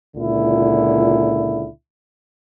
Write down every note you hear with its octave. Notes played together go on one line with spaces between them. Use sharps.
C#2 A#2 D3 E4